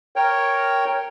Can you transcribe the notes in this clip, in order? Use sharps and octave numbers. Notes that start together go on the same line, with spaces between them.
A#4 C#5 G5